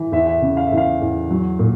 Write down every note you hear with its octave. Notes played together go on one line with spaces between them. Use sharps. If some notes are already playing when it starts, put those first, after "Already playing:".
Already playing: E3
E2 E5
E5
C#3
F5
E5
E2
F5
E2
F#3
A#2